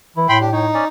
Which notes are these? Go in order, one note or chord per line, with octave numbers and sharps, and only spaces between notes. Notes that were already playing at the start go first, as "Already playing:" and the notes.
E3 E4
A2 G5 B5 C6
D4 G4
D#4 C#5 G5
C#4 D5